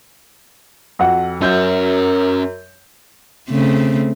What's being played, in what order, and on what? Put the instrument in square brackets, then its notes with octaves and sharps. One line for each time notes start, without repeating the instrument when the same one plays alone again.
[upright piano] F2 F#4 F#5
[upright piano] F#2 G6 [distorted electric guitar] C#4 F#4 [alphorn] A#4
[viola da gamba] C#3 A3 C4